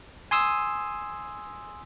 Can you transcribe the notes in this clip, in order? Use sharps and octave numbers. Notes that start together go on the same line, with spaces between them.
G#5 C6 D#6 E6